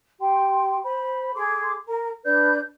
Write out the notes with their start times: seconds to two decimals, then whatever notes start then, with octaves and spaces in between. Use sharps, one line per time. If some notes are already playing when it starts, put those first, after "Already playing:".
0.20 G4 G5 C6
0.83 C5 B5
1.35 G#4 A4 C6 D6
1.88 A#4 A#5
2.24 D4 B4 D5 G6